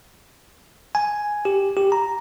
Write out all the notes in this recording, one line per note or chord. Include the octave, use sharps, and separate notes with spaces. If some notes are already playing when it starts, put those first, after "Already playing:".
G#5
G4
G4
A#5